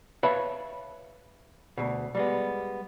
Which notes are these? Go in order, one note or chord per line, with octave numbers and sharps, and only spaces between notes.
B4 C#5 E5 F5 A5 B5
D2 B2
G3 G#3 B3